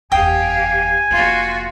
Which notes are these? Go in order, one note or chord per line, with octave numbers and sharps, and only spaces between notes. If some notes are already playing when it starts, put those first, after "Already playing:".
F#1 E2 G4 F5 G5 G#5 D#6
F1 A#3 F4 F#4